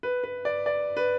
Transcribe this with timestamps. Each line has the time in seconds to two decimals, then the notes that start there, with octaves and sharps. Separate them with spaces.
0.03 B4
0.24 B4
0.45 D5
0.66 D5
0.97 B4